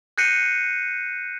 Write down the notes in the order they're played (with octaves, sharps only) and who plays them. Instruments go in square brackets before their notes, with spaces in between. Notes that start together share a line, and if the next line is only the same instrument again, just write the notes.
[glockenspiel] F#6 G6 A#6 C7 C#7 D#7